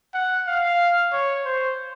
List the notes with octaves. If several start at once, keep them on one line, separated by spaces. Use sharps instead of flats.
F#5
F5
C#5
C5